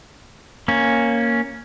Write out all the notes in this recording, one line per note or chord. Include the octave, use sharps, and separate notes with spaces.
A#3 C#4